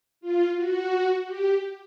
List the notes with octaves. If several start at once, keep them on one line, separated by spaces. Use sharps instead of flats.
F4
F#4
G4